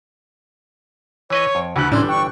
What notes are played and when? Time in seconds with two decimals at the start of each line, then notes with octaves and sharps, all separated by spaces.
1.30 E3 B4 C#5 D#5
1.55 F2
1.76 D2 E3 B5 F#6
1.92 G1 A2 E3 G3 C#4 D4 E4 C6
2.09 G5 C#6